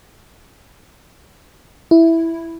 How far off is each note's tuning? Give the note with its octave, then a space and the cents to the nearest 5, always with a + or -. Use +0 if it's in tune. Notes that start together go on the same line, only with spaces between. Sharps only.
E4 +0